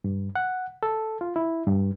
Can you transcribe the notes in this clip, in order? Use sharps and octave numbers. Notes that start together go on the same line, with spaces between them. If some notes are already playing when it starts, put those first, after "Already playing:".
G2
F#5
A4
F4
E4
G2